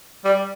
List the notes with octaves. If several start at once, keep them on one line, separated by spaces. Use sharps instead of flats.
G3